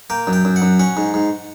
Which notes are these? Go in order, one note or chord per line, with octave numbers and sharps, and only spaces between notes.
A#3 G5
F#2
G5
F#2
F#5
F#2
C#4 F#5
G#2
G#2